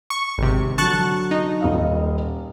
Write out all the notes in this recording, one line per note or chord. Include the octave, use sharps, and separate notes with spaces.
C#6
G#1 C3
D3 F#3 A5 C#6 F#6
D#4
D#1 D#5 F5